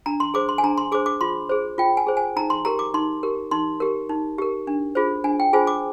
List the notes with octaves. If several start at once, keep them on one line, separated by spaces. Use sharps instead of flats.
D4 A#5
C6
G#4 C5 D6
C6
G#5
D4 A#5
C6
G#4 C5 D6
D6
F4 C6
G#4 C5
F4 G5
G#5
G#4 C5
G#5
D#4 A#5
C6
G4 A#4 A#5
D6
D#4 C6
G4 A#4
D#4 C6
G4 A#4
D#4
G4 A#4
D4
F4 G#4 C5
D4 G#5
G5
F4 G#4 C5 G#5
D6